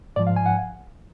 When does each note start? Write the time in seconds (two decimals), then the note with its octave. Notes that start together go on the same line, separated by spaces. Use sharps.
0.16 G#2 F3 D5
0.27 F5
0.36 G#5
0.46 F#5